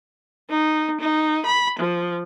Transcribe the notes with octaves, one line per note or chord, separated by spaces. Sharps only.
D#4
D#4
B5
F3